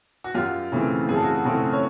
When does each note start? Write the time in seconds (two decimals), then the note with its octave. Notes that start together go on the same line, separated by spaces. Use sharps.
0.24 F#4
0.35 F#2 F4 G4
0.72 C#3 E3 A3 C4
1.09 F#2 G#4
1.16 A4
1.22 F#4 G#4
1.45 C#3 E3 A3 C4
1.73 C#5